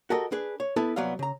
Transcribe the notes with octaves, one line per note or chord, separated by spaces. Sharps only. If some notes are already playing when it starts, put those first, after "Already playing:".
F#4 G4 A4 A#4 D#5
D4 G#4 B4
C#5
B3 E4 A4 B4 A5
C2 F#3 B3 D5 F5
C#3 A#5